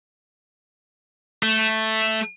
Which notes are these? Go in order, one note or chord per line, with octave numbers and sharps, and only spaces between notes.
A3